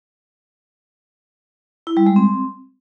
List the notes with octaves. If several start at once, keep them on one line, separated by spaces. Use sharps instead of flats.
E4
G3
G#3
C4